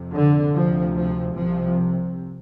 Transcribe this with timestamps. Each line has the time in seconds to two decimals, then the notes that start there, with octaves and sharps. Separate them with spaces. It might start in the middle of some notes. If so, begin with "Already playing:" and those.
Already playing: F2 C3
0.14 D3
0.55 D2 C3 F3
0.97 F3
1.37 C2 C3 F3